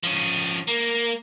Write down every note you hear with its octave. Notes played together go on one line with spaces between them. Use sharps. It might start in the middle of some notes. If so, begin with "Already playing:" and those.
F3 C#4
A#3